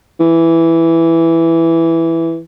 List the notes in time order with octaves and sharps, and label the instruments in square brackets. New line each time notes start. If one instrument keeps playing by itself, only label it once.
[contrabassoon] E3